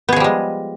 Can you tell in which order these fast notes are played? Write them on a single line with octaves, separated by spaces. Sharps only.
B3 G#4 F3 G3 G#3